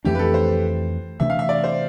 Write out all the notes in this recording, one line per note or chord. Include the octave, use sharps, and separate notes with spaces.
F2 E3 A3 D4 G4
B4
A4
C5
C3 E3 A3 D4 E5
F5
E5
D5
C5